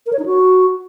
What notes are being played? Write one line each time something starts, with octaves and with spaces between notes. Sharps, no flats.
A#4
C#5
D#4
F#4